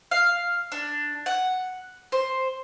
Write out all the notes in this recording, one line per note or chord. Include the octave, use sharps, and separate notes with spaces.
F5
D4
F#5
C5